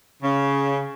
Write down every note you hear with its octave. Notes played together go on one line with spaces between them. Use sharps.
C#3